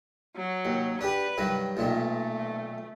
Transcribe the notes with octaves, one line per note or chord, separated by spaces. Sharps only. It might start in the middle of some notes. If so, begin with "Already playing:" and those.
F#3
D#2
D4 G4 B4
G2 D#3 F#3
B1 A#2 D#3 A3